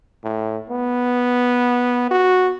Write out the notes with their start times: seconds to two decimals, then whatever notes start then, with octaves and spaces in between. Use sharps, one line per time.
0.24 A2
0.70 B3
2.11 F#4